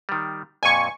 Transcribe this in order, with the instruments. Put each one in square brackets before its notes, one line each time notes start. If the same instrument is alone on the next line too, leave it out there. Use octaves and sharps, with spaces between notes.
[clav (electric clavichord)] D#3 G3
[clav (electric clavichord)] F2 A#2 [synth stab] G#5 C#6